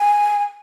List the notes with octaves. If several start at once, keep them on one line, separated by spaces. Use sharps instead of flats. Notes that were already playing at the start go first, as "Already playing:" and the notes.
Already playing: G#5